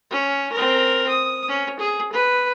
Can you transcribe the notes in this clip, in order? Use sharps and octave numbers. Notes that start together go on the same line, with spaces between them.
C#4
C4 A#4
D#6
C#4
G#4
B4